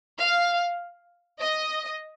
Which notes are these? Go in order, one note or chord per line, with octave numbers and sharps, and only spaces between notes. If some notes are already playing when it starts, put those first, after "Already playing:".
F5
D#5